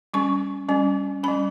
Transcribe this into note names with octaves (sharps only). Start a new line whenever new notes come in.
G3 C#4 C#6
G3 C#4
G3 C#4 B5